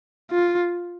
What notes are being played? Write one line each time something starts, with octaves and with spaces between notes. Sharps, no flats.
F4